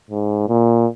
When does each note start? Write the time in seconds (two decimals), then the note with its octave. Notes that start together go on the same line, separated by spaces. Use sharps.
0.11 G#2
0.48 A#2